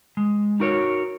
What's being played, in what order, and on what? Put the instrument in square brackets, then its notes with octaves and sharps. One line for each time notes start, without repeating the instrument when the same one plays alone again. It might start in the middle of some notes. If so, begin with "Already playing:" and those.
[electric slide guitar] G#3
D#4 F#4 A#4 C#5